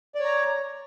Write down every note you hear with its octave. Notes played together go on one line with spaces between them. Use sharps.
C#5 D5 A#5